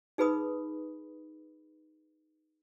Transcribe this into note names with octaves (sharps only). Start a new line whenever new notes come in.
D#4 G#4 B4 B5 D#6